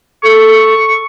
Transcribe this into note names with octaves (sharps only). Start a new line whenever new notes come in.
A4 C#6